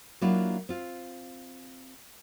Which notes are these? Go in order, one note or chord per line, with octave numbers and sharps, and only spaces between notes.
F#3 A#3 D4 E4 F4
C4 F4